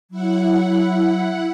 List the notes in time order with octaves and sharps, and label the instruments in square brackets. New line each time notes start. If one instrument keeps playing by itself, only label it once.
[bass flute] F#3 [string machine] E4 F#5